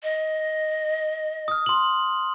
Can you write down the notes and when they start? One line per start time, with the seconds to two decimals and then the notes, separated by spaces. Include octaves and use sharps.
0.03 D#5
1.48 D#6 F6
1.66 C6 F#7